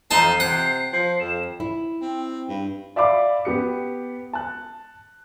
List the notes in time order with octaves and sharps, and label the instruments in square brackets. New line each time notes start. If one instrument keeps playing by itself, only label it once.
[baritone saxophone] F2 [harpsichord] D#4 A5 [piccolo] C7
[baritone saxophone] C3 [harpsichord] F#5
[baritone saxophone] F3 [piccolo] C7
[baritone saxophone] F2 [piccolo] E7
[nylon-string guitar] E4
[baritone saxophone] C4
G2
[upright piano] D5 E5 F5 B5 D6
B3 G4 C#7
A5 F#6